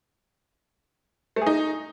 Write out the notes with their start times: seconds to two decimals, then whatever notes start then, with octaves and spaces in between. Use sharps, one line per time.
1.36 A3
1.41 G#4
1.46 D#4